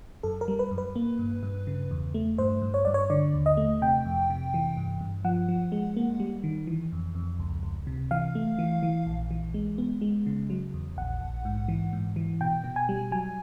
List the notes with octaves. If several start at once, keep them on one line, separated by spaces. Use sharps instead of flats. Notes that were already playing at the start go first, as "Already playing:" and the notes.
F#2 A4
A#4
G3
B4
F#2
B4
A#3
G2
G2
C#3
E2
A3
G2 C5
G2
C#5
G2 D5
C#5
D3 D5
D#2
D#5
A3
C3 G5
F2
C3
E3
G2
G2
F3 F#5
F3
G#3
A#3
G3
D#3
E3
F2
F2
C#2
C#2
C3
E3 F5
A3
E3
E3
A#1
E3
G#3
B3
G#3
C#3
F#3
E2
A#1 F#5
A#1
G#2
E3
G#2
E3
B2 G5
B2
G#5
G3
F#3 G#5